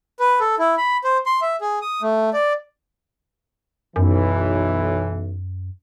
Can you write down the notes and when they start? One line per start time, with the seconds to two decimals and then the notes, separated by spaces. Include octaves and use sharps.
0.20 B4
0.40 A4
0.59 E4
0.77 B5
1.04 C5
1.26 C6
1.41 E5
1.61 G#4
1.82 D#6
2.02 A3
2.33 D5
3.96 B1 F#2 E3